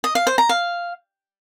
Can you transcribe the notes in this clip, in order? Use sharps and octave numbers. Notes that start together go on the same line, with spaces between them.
D#5
F5
C5
A#5
F5